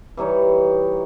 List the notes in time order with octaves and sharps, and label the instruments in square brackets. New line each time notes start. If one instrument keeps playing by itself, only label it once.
[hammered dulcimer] E3 G3 D#4 C#5